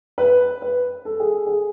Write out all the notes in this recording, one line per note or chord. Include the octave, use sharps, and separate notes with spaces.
B4
B4
A4
G#4
G#4